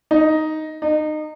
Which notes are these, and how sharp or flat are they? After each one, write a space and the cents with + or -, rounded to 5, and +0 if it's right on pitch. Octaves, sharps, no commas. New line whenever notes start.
D#4 +5
D#4 -25